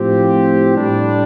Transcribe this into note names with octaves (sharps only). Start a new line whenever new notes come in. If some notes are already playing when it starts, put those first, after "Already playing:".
Already playing: A2 F3 C4 G4
A2 G3 D4